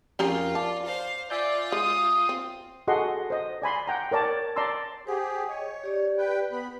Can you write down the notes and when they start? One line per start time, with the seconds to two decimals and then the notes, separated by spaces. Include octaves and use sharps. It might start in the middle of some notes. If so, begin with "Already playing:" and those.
0.19 F2 C#4 F4 G4 G#4 A#4 F5
0.55 D5 A5
0.85 C5 F5
1.30 F4 D5 E5 G#5 G6
1.72 G#3 D#6
2.29 C4
2.88 F#4 G#4 A4 D#5 F#5 C6
3.30 C5 D#5
3.62 D5 G#5 B5 C6
3.87 F#5 G5 A#5
4.11 A#4 C#5 D5 A5
4.56 D5 A5 A#5 C6 E6
5.07 G4 G#4 C5 F#5
5.49 C#5 D#5
5.84 G4 D5
6.18 B4 G5
6.52 B3 B4 B5